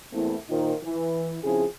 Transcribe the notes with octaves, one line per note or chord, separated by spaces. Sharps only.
E2 A3 A#3 C4 E4
A#2 D#3 D#4 F4 A#4 C5
E3
C#3 F3 C4 E4 G#4